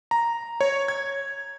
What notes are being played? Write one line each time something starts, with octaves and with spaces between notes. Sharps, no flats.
A#5
C#5
G#6